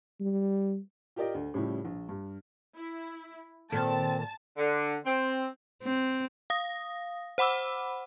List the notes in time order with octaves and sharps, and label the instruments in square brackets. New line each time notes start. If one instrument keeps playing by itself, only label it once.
[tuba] G3
[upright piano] F4 G4 A#4 D5 D#5 G5
D2
A2 C#3 F3 G3 E4 G4
A#1
G2
[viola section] E4
[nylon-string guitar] A#2 A4 [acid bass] D#3 [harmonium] C4 [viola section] A5
[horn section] D3
C4
[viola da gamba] C4
[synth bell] F5 D#6 A#6
C5 F#5 B5 D6 E6